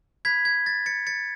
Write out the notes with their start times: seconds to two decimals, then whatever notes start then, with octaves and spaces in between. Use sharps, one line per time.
0.25 B5 F#6 G#6 B6
0.45 G#6
0.66 A6
0.86 A6 C#7
1.07 A6 C#7